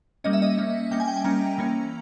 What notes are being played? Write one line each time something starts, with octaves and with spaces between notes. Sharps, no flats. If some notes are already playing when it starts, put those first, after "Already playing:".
G3 A#3 C#4 D#5
E5
D#5
G3 A#3 C#4
G3 A#3 C#4 G5
G#5
G5
G#5
G3 A#3 C#4 A#5
E3 A#3 C#4